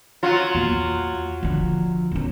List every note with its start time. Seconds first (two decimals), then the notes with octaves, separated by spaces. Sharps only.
0.23 F#3 F4
0.55 E2 A#3
1.43 D3 F3
2.11 E2 C#4